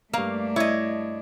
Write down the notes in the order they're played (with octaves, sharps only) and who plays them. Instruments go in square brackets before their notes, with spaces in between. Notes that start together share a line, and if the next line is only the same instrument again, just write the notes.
[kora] G2 F5 [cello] A3 D4 [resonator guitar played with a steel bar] A#3
[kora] E4 [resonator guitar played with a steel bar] C#5 D#5